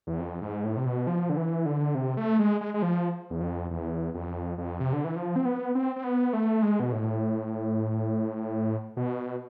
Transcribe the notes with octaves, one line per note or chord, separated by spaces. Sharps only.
E2
F2
G#2
A2
C3
B2
F3
D3
E3
D3
C3
A3
G#3
G#3
G#3
F3
E2
F2
E2
F2
F2
C3
D3
E3
F3
C4
B3
C4
C4
B3
A3
G#3
B2
A2
B2